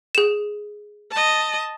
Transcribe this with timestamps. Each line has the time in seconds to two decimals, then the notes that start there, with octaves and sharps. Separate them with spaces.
0.15 G#4 E7
1.11 D#5 A5